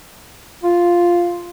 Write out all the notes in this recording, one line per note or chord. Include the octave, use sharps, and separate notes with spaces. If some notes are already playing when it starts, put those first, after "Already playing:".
F4